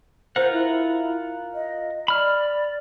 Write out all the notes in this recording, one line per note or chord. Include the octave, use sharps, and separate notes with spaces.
F4 A#4 C5 F#5
E4
D#5
D5 B5 F6